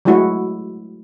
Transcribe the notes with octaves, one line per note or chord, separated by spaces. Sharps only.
F#3 G#3 A3 E4 F#4